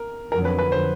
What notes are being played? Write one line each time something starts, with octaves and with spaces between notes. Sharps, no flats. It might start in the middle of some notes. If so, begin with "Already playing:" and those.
Already playing: A#4
F2 D3 F#3 A#4
B4
B4
C5